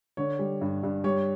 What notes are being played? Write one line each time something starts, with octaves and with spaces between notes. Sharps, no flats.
D3 C#5
G3
G2
G2
G3 C#5